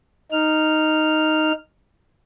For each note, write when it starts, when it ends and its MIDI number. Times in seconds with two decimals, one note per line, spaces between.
0.32 1.52 63
0.32 1.52 89